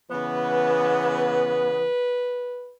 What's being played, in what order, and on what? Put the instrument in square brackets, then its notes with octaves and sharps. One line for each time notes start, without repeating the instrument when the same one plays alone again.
[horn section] C#3 E3 B3 [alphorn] B4